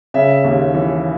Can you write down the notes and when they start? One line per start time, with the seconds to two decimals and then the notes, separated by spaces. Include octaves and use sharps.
0.14 C#3 E5
0.44 D#2
0.74 E3